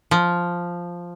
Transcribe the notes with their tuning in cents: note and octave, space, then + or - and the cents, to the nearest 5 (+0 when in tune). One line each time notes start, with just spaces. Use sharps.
F3 +0